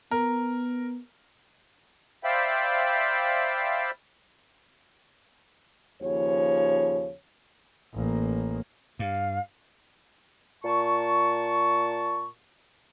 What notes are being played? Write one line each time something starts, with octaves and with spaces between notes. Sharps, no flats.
B3 A#4
C5 D5 E5 F5 G5 B5
D#2 C#3 F3 C#5
A1 A#3
G2 F5
A#2 A5 C#6